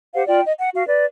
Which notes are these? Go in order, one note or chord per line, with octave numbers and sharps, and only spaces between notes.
G4 C5 F5 F#5
F4 D5 G5
D#5
F#5
F#4 F5
B4 D5